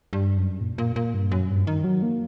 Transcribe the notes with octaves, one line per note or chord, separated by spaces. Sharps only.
G2
F#2
A#2
A#2
A#2
G2
F#2
G2
D#3
F#3
A#3